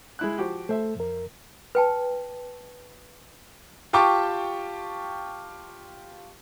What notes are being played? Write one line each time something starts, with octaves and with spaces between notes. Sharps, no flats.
G#3 E4 F#6
F3 F#4 G4
A3 A4 C5 E5
F2 A#4
B4 G5 A5
F4 G4 G5 A5 C#6 D6